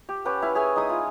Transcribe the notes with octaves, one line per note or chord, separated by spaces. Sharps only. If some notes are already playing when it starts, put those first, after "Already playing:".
G4
C#4 G4 B4 F#5
E4 F5
G#4 C#5 E5 G#5
G#3 D#4 E4 D#6
F4